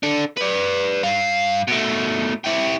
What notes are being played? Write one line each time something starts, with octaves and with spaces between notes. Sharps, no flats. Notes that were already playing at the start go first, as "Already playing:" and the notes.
D4 A4
B4 D5
G2 F5
B2 A3
E4 G4